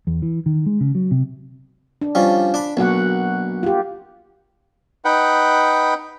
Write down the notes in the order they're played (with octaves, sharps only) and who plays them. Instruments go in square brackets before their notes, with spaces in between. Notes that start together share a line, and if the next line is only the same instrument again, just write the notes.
[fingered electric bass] E2
E3
D#3
G#3
C#3
F#3
C3
[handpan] D4
[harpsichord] F3 G3 C#4
D4 B5
[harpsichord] B1 [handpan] A#3 F#4 F#5
[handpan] F4 G4
[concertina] D#4 B4 F#5 G5